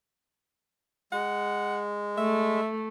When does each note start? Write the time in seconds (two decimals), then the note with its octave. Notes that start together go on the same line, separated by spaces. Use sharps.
1.12 G#3 F#5
2.18 A3 E5